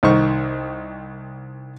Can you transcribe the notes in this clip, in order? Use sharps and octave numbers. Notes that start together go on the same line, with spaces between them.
C2 D#3 D#4 C5 C#6